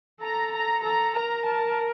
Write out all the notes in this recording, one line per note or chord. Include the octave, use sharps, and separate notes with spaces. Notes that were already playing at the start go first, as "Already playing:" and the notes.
A4 A#5
A#5
A4 A#5
A#4 A#5
A5